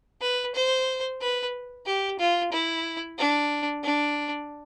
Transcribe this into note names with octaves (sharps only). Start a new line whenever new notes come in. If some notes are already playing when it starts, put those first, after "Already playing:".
B4
C5
B4
G4
F4
E4
D4
D4